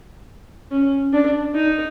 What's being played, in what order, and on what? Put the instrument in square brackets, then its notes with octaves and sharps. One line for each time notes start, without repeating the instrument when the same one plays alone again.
[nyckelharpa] C#4
D4
D#4